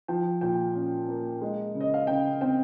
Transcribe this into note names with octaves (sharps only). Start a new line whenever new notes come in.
F3 G5
A#2 G5
C#4
A#3
G#3
C#3
D#5
F5
C#3 G5
C4 G5